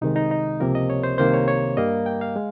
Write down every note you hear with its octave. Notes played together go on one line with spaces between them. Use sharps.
C2 C3 D#3 G#3 D#4
D#4
D#4
C#2 C3 F3 A#3 A#4
D#5
C#5
C5
C2 C3 D#3 A#3 C5
C#5
C#5
G2 G3 A#3 D#5
G5
F5
G#3